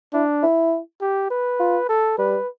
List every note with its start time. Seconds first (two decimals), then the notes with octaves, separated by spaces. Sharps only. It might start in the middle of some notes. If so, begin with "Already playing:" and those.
0.13 D4 E4
0.43 E4
1.01 G4
1.31 B4
1.60 F4
1.89 A4
2.18 G3 B4